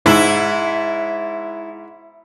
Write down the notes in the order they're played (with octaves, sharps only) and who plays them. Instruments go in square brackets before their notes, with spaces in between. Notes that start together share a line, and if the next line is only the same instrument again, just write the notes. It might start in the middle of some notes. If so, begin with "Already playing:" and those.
[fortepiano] G#2 [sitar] E4